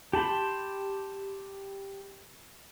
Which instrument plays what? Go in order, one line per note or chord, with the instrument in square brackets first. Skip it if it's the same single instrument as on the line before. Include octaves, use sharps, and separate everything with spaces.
[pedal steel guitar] G4 A5 B5 C6